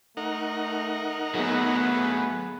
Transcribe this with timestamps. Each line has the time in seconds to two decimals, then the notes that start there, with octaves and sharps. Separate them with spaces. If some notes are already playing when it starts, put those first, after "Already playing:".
0.17 A3 D#4 A#4 F#5
1.34 F#3 A3 B3 G#4 B4